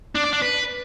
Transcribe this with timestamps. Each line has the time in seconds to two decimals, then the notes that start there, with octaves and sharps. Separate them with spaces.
0.15 D4
0.24 D5
0.33 D4
0.42 B4